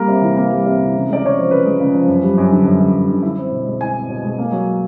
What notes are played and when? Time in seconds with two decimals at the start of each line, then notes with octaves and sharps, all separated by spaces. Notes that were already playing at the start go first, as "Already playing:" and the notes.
Already playing: G3 A#3 A#4
0.08 C3
0.22 E3
0.37 A#3
0.51 G3
0.66 C3
0.80 E3
0.94 C#3
1.08 G#3 D5
1.22 C#3 C#5
1.36 F3 C5
1.51 C#3 B4
1.65 G#3
1.80 C#3
1.93 F3
2.08 F#2
2.23 G3
2.38 F#2
2.51 D3
2.66 F#2
2.79 G3
2.95 F#2
3.09 D3
3.23 E4
3.38 C4
3.51 B2
3.67 G#3
3.81 E4 G#5
3.94 C4
4.09 B2
4.24 G#3
4.38 A#3
4.52 F#3